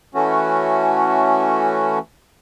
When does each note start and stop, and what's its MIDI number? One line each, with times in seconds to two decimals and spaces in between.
0.15 1.99 52
0.15 1.99 57
0.15 1.99 61
0.15 1.99 66